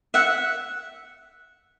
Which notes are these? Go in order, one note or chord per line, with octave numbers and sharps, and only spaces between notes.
E5 F#5